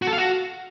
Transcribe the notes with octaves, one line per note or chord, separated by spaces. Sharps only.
F#4
A4
F5
F#4